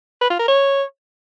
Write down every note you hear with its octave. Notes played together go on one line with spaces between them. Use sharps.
B4
F4
A#4
C#5